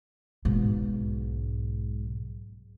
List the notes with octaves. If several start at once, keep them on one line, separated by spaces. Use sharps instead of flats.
B1 G#2